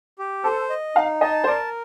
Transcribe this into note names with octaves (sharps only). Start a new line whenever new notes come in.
G4
A4 C5
D#5
D#4 F5
D#5 A5
C5
A#4 D5